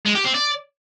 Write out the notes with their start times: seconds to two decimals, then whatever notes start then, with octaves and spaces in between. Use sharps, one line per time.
0.06 G#3
0.16 G4
0.25 C4
0.35 D5